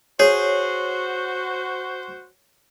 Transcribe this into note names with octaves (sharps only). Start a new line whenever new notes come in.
F#4 G#4 C5 C#5